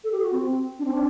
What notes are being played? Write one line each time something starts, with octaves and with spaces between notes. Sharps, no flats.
A4
G4
F#4
C4
D4
C4
D4